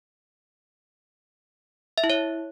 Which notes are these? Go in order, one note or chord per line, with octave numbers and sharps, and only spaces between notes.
E5
E4
C#5